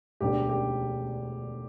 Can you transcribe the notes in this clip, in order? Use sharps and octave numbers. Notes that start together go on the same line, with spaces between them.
E1 D2 D3 G3 D4 G4
G4